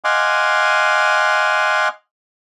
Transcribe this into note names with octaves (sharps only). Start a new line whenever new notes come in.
D#5 F5 F#5 G#5 C6 D6